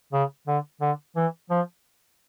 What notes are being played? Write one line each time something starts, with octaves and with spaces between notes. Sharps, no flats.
C#3
D3
D3
E3
F3